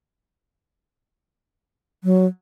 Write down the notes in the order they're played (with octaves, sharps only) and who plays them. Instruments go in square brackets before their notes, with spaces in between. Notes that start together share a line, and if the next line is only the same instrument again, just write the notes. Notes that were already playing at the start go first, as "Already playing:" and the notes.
[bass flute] F#3